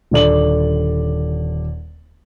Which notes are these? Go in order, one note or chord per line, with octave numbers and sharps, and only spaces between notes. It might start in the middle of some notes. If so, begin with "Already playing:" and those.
D#1 D3 D5 F#7